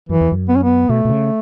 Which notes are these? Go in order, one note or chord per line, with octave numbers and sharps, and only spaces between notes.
F#2 E3
E2
F#2
B3
C#4
B3
B2 A3
B2
C#3